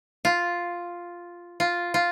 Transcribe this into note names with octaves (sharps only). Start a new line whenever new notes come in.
F4
F4
F4